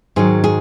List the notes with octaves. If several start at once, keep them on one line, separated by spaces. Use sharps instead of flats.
G#2 D#3 F#3 G#4
G#4